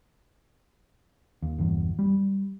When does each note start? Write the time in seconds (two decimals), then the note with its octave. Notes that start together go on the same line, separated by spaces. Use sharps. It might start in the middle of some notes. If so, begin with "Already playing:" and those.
1.42 D#2
1.58 G1 E2
1.99 G3